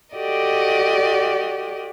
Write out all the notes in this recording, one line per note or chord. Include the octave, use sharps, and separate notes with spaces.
F#4 G4 A4 D5 D#5